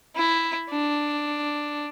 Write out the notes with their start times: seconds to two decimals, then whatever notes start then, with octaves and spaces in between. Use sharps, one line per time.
0.16 E4
0.69 D4